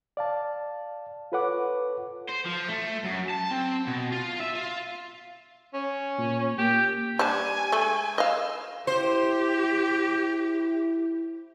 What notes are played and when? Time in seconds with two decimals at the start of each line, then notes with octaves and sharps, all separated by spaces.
0.17 D5 F5 A5
1.32 F4 A4 B4 C#5 F#5 D6
2.29 C5
2.46 F3
2.69 A3
3.04 F#2
3.30 A5
3.51 C4
3.87 B2
4.12 F4
4.40 E5
4.55 F4
5.74 C#4
6.18 A#2
6.58 A#3 G4
7.19 G3 D4 G#5 A5
7.72 G#3 A3 A4
8.18 D#5 F5 E6
8.87 E4 G4 C5